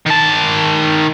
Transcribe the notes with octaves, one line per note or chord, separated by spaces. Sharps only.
D#3 A5